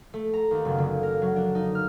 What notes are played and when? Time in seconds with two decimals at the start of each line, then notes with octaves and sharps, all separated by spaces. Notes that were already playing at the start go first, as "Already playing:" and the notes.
0.14 A3
0.33 A#5
0.51 D#2
0.65 F#1
0.78 D3
1.03 A#4
1.22 F#3
1.36 D4
1.55 D#4
1.75 F6